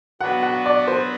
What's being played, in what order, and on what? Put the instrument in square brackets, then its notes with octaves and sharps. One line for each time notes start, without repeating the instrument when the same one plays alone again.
[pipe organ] F#3 B3 D4 F#4 B4 [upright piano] F#5
[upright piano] F#5
D5
C5